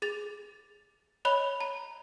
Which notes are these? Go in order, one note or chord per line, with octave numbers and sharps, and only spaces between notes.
G#4 A6 F7
C#5 D#5 B5 F#6 F7 G7
A#5